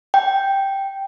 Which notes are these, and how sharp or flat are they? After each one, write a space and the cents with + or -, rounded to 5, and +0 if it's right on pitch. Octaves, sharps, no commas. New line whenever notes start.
G5 +0